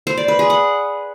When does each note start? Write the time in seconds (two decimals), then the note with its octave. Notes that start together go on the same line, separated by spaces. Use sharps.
0.07 C5
0.17 D5
0.28 B4
0.39 G#4
0.50 F#5